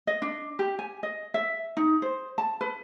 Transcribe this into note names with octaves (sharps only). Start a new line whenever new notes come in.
D#5
D4
G4
G#5
D#5
E5
D#4
C5
A5
B4